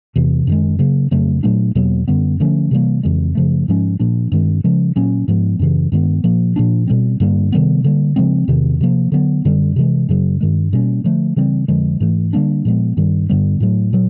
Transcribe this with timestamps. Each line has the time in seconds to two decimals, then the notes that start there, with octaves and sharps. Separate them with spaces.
0.16 E2 C3 E3
0.47 F#2 D#3 G#3
0.79 C#3 F#3 A#3
1.11 F2 C#3 F#3 A3
1.43 A#2 F#3 A3 D4
1.75 E2 B2 F#3 A#3
2.08 F#2 D3 G3 B3
2.40 D3 F3 A3 C#4
2.71 C3 E3 G3 A#3
3.03 F2 C#3 E3 G#3
3.35 F#2 C#3 F3 A3
3.68 G#2 F3 G#3 C#4
3.99 A#2 F3 A#3 D4
4.32 G2 D#3 G#3 C4
4.64 C#3 F3 G#3 C#4
4.96 A#2 F#3 A#3 C#4
5.28 G#2 F3 G#3 B3
5.59 F#2 C#3 E3
5.92 G2 D#3 G#3 B3
6.24 A#2 F3 A#3
6.56 A#2 F3 A#3 D4
6.87 B2 G3 C4
7.20 G2 D3 G3 A#3
7.52 C3 D#3 G3 B3
7.84 D3 G3 A#3
8.16 C#3 F3 G#3 C4
8.48 E2 C3 D#3
8.81 C3 F3 A#3
9.12 D3 F#3 B3
9.45 F#2 D3 G3
9.76 C3 E3 G#3
10.09 F#2 C#3 F#3
10.41 G2 D#3 G#3
10.73 B2 G3 A#3 C#4
11.04 D3 F3 A3
11.36 C#3 E3 G3 C4
11.68 F2 D3 F3 G#3
12.00 G#2 E3 A3
12.33 D3 G3 A#3 D4
12.65 A#2 F3 G#3 B3
12.97 G2 D#3 G3
13.29 G2 D3 G3 B3
13.60 A2 F#3 A3
13.93 A#2 F#3